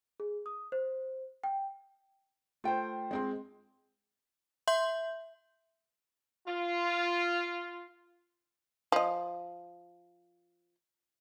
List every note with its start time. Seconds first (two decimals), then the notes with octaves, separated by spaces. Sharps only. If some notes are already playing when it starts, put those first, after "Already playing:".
0.20 G#4
0.46 D#6
0.72 C5
1.44 G5
2.64 A3 F4 C5 G5
3.11 G#3 C4 C6
4.67 E5 C6 G6 F#7
6.47 F4
8.92 F3 D#5